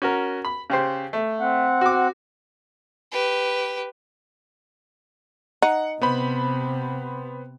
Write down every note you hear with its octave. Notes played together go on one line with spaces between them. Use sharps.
C#4 F#4 A#4
B5
C#3 G4 C5
A3
C4 F#5
F#4 D6
G4 B4
D#4 F#5
C3 B3 C5 B5